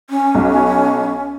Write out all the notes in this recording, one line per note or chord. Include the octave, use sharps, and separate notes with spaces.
C#4
B1